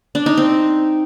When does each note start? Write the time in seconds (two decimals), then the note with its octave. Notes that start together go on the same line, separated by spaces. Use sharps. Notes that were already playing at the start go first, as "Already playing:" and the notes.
0.15 D4
0.26 D#4
0.37 C4